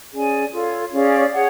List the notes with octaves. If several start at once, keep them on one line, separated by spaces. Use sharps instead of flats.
C#4 G#4 D5 G#5
F4 A4 C#5 F5
C#4 G#4 D5 F5
G#4 C#5 F#5